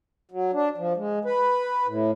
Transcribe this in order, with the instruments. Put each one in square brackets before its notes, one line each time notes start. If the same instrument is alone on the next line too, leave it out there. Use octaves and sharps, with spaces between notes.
[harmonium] F#3
D4
F3
G#3
B4
A2